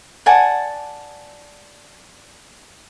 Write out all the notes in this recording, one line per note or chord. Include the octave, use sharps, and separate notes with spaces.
D5 F#5 G#5 A5